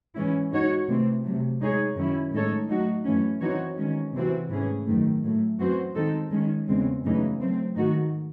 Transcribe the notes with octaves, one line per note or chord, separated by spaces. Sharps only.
G#2 E3 G#3 C#4 E4
G#3 D#4 F#4 C#5
C3 E3 A3 C4
C3 F#3 A3
G#3 D#4 G#4 C#5
F#2 D#3 F#3 C#4 E4
A2 G#3 D#4 A4 C#5
F#3 A3 D#4 F#4
F#2 E3 A3 C#4
E3 C4 D#4 F#4 C#5
D#3 G#3 C#4
C3 E3 C4 F#4
G#2 E3 A3 C#4 G#4
F#2 D#3 A3
A2 F#3 A3
F#2 E3 C4 F#4 C5
D#3 G#3 C4 D#4 A4
D#3 G#3 C#4
E2 C#3 G#3 C4
F#2 C#3 E3 A3 D#4
F#3 A3 C4
G#2 D#3 A3 D#4 F#4